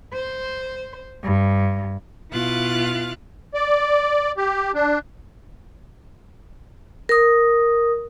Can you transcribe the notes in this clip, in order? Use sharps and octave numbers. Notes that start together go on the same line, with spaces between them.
C5
G2
B2 E4 F4 F5 F#6 A6
D5
G4
D4
A#4 D#6